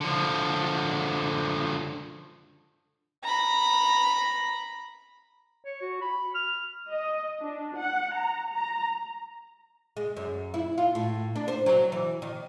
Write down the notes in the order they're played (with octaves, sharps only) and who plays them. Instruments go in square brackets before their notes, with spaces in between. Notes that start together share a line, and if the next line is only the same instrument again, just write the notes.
[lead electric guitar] D3 F3
[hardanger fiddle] A#5 B5
[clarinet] C#5
F#4
B5
F6
[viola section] D#5
D4
F#5
A#5
A#5
[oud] G#3
F#2
E4
F4
A2
D4
C5
F#3
E3
D#3